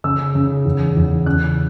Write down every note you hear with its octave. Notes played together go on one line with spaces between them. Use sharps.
C#3 E6
C#3
E2
E2
C#3 F#6